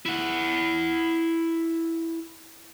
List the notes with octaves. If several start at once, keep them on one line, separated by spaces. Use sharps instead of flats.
E4 F#5